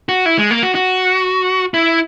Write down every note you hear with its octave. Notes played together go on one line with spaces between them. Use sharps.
F#4
E4
G#3
A#3
F#4
F#4
E4